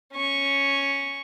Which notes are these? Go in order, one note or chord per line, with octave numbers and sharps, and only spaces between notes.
C#4 C#6